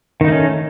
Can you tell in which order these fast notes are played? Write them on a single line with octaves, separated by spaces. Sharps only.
D#3 D#4 A3 C#4